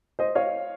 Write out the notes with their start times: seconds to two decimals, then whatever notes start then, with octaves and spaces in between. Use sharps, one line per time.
0.19 C5 D#5
0.35 C#5 F5